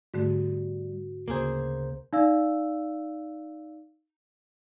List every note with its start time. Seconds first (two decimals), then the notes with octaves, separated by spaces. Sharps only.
0.14 G#2 D3 G3 A3 F#4
1.28 D2 C#3 A#3 G#4 C5
2.13 D#4 D5 F5 E6